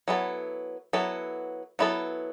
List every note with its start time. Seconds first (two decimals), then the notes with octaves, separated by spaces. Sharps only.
0.08 F#3 B3 E4 A4
0.93 F#3 B3 E4 A4
1.79 F#3 B3 E4 A4